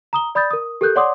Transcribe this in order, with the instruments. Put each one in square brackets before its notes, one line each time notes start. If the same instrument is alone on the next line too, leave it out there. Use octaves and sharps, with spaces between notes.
[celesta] A#5 D#6 G7
D5 B5 D#6 G6 A6
A#4 D#6
G4 A4 A#4 F#6 G6
C#5 D5 F#5 C6 D6 D#6